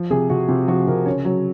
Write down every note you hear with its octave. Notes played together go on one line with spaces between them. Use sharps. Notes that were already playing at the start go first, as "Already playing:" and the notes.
Already playing: F3
C3 G#4
C3 F#4
C3 F4
F3 F#4
C3 A#4
C#3 C#5
F#3 C#5